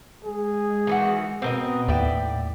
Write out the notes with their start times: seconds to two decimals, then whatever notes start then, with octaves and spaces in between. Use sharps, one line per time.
0.25 G#3 G#4
0.87 D#3 E3 F#4
1.42 B2 B3 C4 A#4 D#5
1.88 D#2 A2 D5 E5 G5